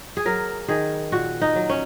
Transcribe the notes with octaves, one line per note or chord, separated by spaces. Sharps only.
G#4
F#3 A#4
D#3 G#4
A#2 F#4
D#4
F#3
C#4